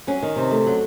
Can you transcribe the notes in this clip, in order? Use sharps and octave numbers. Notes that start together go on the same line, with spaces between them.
F#3 C#4
D#3
C3
A3
F#3